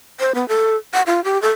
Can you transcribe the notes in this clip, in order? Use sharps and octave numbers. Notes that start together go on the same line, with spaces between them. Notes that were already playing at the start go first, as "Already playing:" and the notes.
C5
B3
A4
F#5
F4
G4
A4